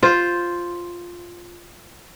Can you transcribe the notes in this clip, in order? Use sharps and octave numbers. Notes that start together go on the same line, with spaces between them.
F4 C5